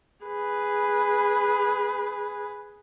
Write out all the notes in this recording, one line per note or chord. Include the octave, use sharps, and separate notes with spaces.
G#4 B4